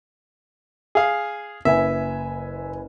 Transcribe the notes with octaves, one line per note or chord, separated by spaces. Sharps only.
G#4 F5
F#1 B4 E5 G#5